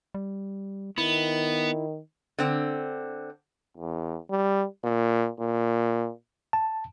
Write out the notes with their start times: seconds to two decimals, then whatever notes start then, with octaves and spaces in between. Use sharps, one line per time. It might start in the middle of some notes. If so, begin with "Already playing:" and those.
0.14 G3
0.98 D#3 B3 E4
2.39 D3 C4
3.77 E2
4.30 G3
4.84 A#2
5.40 A#2
6.53 A5